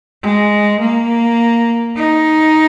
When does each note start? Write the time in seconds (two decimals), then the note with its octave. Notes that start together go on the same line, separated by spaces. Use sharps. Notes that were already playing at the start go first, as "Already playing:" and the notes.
0.23 G#3
0.81 A#3
1.96 D#4